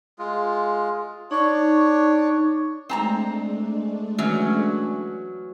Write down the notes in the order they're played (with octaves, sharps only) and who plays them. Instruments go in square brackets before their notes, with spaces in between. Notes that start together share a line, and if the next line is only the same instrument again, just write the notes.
[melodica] G#3 F4
[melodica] D4 C#5 [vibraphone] D#4 C#6
[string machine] G#3 A3 D4 [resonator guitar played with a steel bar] C4 A5 A#5
[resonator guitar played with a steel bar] E3 F#3 C#4